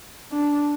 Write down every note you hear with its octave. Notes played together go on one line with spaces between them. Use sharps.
D4